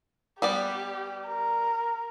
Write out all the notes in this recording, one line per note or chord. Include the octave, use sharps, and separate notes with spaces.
G3 B3 G4 D5
A#4